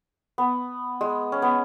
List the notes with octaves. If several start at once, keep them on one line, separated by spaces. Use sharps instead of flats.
B3
G#3
C#4
B3